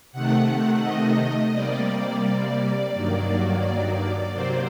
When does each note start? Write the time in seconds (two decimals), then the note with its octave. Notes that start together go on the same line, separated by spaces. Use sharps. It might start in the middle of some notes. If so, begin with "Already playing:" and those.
0.12 C3 D#3 A3 F#5
0.47 F#5
0.82 D#5
1.53 C3 G3 A#3 D5
2.24 D5
2.93 G2 D#3 F#3 A#3
4.33 C3 F#3 A#3 C5